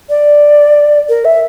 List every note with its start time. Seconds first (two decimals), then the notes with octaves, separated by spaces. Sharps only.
0.09 D5
1.09 A#4
1.25 E5